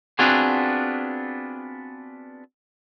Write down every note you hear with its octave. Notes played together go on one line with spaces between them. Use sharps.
B3 C4 D4 F4 F#4 G#4